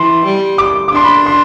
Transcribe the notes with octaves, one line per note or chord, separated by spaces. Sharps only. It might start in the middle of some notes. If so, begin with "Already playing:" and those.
Already playing: E3 C6
G3
D6
D6
D4 C6
B5
C6